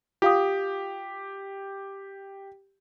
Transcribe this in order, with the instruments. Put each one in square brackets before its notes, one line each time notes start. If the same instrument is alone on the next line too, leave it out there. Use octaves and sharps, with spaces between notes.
[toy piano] F4 F5 D#6 [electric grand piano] G4